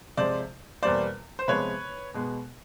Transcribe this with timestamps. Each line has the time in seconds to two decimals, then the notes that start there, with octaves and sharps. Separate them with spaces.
0.17 C3 F3 G#3 C5 D5
0.83 E2 B2 G3 A#3 C5 D5
1.39 C5
1.48 C3 F3 G#3 B3 B4 C#5
2.14 B2 G#3 B3